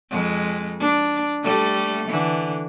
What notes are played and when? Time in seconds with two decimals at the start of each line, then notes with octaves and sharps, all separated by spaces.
0.11 F2 G#3
0.80 D4
1.43 G3 A3 A4
2.08 D3 E3